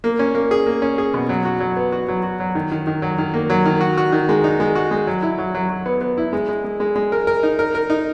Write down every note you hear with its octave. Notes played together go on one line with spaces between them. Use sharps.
A#3
C#4
A#3
G#4
A#3
C#4
G#4
B2
F#3
F#4
F#3
B3
F#4
F#3
F#4
F#3
D#3
D#3
D#3
F#3
D#3
A#3
F#3
D#3
F#4
F#4
D#3
G#3
D#4
G#3
F#4
G#3
F#3
E4
F#3
F#3
F#3
B3
B3
E4
G#3
G#3
G#3
G#3
G#3
A#4
A#4
D#4
A#4
A#4
D#4